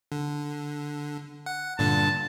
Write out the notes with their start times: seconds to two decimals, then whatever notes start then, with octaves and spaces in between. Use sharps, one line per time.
0.12 D3
1.46 F#5
1.79 G2 A#2 D3 A5